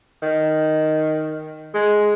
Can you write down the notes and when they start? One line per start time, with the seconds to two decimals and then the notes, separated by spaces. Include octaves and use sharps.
0.22 D#3
1.75 G#3